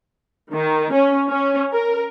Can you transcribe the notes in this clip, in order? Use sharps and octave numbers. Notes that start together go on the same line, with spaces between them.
D#3
C#4
C#4
A#4